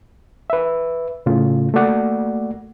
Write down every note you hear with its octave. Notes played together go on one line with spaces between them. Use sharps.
B4 E5
A2 C#3 A3 F4
A3 A#3 F#4 D5 F#5